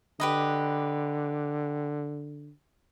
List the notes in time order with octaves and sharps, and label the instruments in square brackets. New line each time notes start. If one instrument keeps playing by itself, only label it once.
[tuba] D3 [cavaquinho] G4 B4 D#5